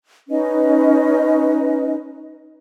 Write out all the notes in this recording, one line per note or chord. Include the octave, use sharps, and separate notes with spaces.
C#4 D#4 B4 D#5